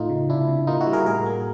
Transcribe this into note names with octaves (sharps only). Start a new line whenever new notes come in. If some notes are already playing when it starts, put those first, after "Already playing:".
Already playing: A2 A3 D#4 F4
C#3
C3 D4 E4
C3
A#3 D#4 F4
E4 F#4
G3
G#4 A#4
A2 G#4 A#4
A#3